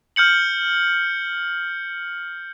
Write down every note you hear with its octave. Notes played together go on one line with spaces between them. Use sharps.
F6 G6 C#7 F#7